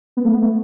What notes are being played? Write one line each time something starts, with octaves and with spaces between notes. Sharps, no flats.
B3
A3
B3
A3